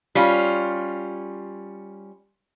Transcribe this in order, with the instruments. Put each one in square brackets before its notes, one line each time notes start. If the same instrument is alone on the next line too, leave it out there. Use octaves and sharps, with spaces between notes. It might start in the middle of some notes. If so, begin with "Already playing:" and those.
[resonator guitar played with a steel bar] G3 C#4 F4